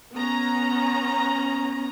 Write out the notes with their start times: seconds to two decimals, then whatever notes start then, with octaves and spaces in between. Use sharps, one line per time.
0.13 B3 C#4 A#5